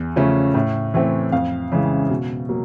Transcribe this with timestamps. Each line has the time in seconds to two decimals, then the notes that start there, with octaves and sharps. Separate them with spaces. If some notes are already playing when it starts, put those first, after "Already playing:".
Already playing: E2
0.16 C#3 F3 A3 C#4
0.54 A2
0.94 E3 A3 C4
1.32 F2 F5
1.72 C#3 E3 G#3
2.10 B2
2.49 F#3 A#3